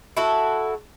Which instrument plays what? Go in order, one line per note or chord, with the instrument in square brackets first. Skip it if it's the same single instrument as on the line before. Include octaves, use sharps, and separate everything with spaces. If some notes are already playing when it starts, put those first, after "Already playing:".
[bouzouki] E4 F#4 A4